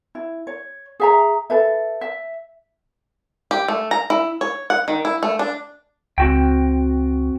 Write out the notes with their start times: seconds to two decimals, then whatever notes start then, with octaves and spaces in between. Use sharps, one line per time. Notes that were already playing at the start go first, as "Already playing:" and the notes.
0.15 E4
0.47 C#5
1.00 G#4 E5 A#5
1.50 A4 B4 E5
2.01 E5
3.51 G4
3.68 A3
3.91 A#5
4.10 E4
4.41 C#5
4.70 F#5
4.88 D#3
5.05 E4
5.23 A3
5.39 D4
6.18 C#2 C4 F#4 G5